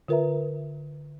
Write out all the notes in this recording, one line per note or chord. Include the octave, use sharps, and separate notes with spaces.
D3 F4 A#4 B4 E5 A#5